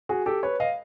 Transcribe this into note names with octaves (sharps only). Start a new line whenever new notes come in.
F#4 G#4
G4 A4
B4 C#5
D#5 F5